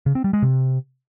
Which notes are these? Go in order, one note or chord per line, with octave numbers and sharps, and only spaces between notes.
C#3
C4
G3
G#3
C3